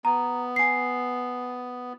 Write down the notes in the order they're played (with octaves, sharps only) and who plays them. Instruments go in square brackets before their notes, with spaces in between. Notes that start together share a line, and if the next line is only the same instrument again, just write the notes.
[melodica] B3 [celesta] A#5
[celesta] G#5 C7